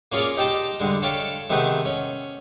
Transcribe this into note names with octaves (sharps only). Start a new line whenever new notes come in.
A#3 C#4 F4 G#4 C#5 D5
D#4 G4 G5 A5 C6
G2 D3 G#3
A4 C#5 F5 G5 A5 B5
C3 D#3 A3 B3 G#4 B4
C#4